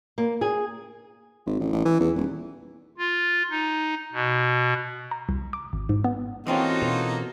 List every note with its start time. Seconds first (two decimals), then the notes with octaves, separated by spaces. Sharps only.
0.18 A#3
0.41 G#4
1.46 G#1
1.60 A1
1.73 A1
1.85 E3
2.00 E2
2.15 D#1
2.98 F4
3.50 D#4
4.13 B2
5.11 A#5
5.29 C2
5.53 D6
5.73 G#1
5.89 G#2
6.04 B3
6.47 E3 A#3 C4 C#4 D#4 F4 F#4 A4
6.82 B2